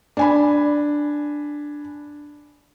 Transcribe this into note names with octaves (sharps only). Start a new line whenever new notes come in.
D4 G#5 B5